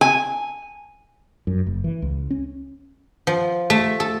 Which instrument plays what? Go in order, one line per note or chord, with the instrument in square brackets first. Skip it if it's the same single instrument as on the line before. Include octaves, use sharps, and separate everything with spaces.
[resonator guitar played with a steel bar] G#5
[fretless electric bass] F#2
F#1
E3
C#2
C#4
[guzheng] F3
A3
A4